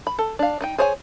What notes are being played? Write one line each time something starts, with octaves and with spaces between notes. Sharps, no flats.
B5
A4
D4 F5
D4 D#4 G5
G#4 C5 C#5 F5 G#5